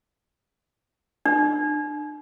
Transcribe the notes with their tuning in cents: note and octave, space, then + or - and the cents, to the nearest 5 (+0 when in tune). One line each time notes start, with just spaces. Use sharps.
D4 +35